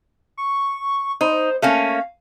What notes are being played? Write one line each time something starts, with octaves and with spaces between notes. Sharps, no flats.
C#6
D#4 C5
A3 A#3 C#4 F5